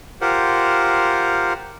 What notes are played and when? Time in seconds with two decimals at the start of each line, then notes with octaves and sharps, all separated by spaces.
0.21 F4 G4 A#4 C5 F#5